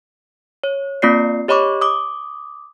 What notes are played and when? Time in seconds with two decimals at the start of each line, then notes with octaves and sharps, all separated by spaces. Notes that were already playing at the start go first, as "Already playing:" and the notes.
0.64 C#5
1.02 A#3 C4 F4 D5 C7
1.48 G4 C#5 D#5 B5 C#6 D6
1.81 D6 D#6